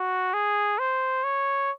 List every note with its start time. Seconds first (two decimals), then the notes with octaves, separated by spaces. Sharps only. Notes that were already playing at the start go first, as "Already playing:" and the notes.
Already playing: F#4
0.33 G#4
0.79 C5
1.24 C#5